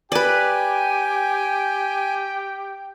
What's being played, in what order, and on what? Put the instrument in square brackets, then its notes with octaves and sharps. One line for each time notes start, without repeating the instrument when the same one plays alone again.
[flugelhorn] G4 [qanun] B4 D5 [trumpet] G5 [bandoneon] G#5